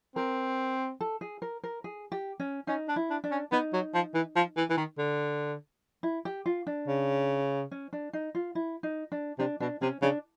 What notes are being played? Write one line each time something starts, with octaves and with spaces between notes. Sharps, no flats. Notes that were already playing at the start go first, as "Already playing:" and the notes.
C4 A#4
A4
G#4
A#4
A#4
G#4
G4
C#4
C#4 D#4
D4
E4
D4
D4
C#4
B3 D#4
F#3
F3
E3
F3
E3
E3
D#3
D3
E4
G4
F4
D4
C#3
C#4
D4
D#4
F4
E4
D#4
D4
C3 D4
B2 D4
C3 C#4
C#3 D4